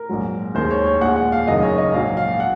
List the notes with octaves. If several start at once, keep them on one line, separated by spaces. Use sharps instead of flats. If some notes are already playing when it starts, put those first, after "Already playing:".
Already playing: A#4
A#1 G#2 F#3
D#2 D#3 G#3 C5
C#5
C#5
A#1 A#2 G#3 F#5
F#5
F5
F#1 F#2 D#3 G#3 D#5
C#5
D#5
A#1 G#2 F#3 F5
F5
F#5